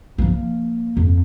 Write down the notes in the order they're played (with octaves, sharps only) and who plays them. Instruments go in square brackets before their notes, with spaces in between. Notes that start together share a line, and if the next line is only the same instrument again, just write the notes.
[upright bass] F3 A#3
F2